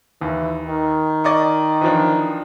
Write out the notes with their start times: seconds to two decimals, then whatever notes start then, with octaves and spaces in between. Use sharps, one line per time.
0.21 D#2 E3
0.66 D#3
1.24 D5 D#5 C#6
1.81 E3 F3 D4